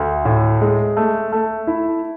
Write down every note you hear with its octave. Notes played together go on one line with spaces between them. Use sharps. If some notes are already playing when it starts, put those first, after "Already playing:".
Already playing: D2
A2
G#3
A3
A3
E4